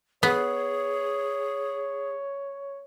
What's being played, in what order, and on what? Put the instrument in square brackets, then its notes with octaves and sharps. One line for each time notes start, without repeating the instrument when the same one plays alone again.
[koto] B3 [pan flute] G#4 [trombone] C#5